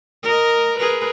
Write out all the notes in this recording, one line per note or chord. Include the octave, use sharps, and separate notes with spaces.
A#4 D#5
G#4 A#4 B4